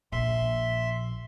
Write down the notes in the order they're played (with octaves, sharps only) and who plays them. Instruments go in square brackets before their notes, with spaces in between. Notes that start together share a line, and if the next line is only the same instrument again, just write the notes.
[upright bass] A#1 [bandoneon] E5 C6